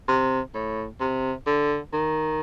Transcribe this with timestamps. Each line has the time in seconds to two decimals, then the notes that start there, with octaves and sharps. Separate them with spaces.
0.08 C3
0.54 A2
1.00 C3
1.46 D3
1.93 D#3